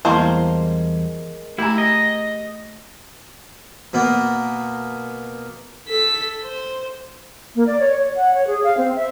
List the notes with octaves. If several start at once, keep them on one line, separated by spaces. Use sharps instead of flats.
E2 G3 G#3 A#3 E4 C5 A5
A3 E4 G4 G#5 A#5
D#5
B2 A#3 B3
A4 B6
C5
A#3
D5
C#5
C#5
F#5
C#5
G#4
F5
C4
E5